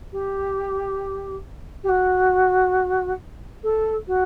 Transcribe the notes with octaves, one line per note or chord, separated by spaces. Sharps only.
G4
G4
F#4
A4
F#4